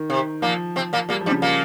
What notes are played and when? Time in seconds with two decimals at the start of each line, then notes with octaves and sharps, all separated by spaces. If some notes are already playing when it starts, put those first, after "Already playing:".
Already playing: D#3
0.10 C3
0.42 A#2 F3 A#3
0.76 C3 C4
0.93 A#2 A#3
1.09 A#2 G3 A#3
1.21 F3
1.26 G2 G3
1.31 C#3
1.42 A#2 A#3